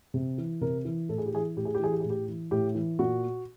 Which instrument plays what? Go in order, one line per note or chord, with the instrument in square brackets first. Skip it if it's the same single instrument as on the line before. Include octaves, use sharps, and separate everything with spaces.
[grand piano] C3
E3
C3 A#4
E3
A2 A4
G#4
G4
E3 G#4
A2 G4
G#4
G4
E3 G#4
G4
G#4
A2
G4
E3
A2 G4
E3
A#2 F#4